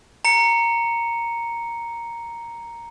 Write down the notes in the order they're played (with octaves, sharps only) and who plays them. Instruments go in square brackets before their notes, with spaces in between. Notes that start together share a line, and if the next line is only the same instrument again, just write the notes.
[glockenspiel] A#5 C#7